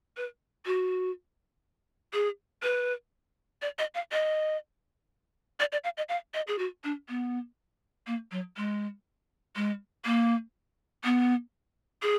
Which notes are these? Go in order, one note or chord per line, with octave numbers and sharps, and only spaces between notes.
B4
F#4
G#4
B4
D5
D#5
F5
D#5
D5
D5
F5
D#5
F5
D#5
G#4
F#4
D4
B3
A#3
F#3
G#3
G#3
A#3
B3
G#4